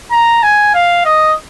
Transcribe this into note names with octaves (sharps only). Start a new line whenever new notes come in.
A#5
G#5
F5
D#5